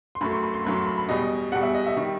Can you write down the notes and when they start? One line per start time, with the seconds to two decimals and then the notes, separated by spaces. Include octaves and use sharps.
0.15 C6
0.21 F#2 F#3 A3 B5
0.32 C6
0.43 B5
0.54 C6
0.65 F#2 F#3 A3 B5
0.75 C6
0.86 B5
0.98 B5
1.09 E2 B2 G3 D#5
1.52 E2 B2 G3 F#5
1.63 E5
1.75 D#5
1.87 E5
1.97 D#3 G3